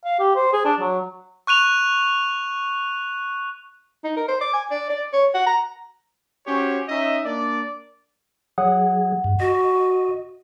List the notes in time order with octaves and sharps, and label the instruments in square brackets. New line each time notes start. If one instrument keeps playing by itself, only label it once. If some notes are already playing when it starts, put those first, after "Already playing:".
[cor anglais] F5
G4
C5
G#4
D4
F#3
[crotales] C#6 F#6 D#7 F7
[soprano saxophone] D#4
A#4
C5
D6
G#5
D5
D5
C#5
F#5
A#5
[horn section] C#4 F#4 G4 C5 C#5
C#4 D#4 D#5 E5
A#3 D4 D5
[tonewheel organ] F#3 G#4 [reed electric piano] F#5
[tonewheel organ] G2
[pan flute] F#4 [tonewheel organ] D#5